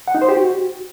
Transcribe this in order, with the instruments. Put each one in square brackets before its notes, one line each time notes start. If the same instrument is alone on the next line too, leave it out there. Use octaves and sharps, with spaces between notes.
[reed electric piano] F#5
D#4
C5
G4
F#4